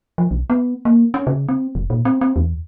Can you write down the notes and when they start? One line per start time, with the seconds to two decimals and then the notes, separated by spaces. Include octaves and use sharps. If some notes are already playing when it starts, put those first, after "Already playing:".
0.18 F3
0.31 B1
0.50 B3
0.85 A#3
1.14 C#4
1.27 C#3
1.49 C4
1.75 F1
1.90 A#2
2.05 C4
2.21 C4
2.36 E2